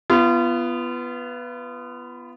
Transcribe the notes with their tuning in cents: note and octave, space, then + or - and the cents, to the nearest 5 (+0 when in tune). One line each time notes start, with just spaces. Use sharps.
B3 +0 F4 -35